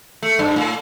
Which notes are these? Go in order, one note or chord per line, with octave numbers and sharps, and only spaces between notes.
A3
G2
A2